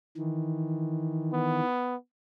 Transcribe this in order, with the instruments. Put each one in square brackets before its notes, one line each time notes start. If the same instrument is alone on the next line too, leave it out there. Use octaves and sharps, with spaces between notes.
[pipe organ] D#3 E3
[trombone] B3